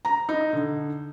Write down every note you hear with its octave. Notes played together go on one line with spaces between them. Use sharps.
A#5
D#4
D3